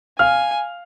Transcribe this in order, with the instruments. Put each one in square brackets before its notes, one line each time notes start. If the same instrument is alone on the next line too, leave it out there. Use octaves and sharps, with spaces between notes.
[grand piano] F5 F6 [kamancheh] G#5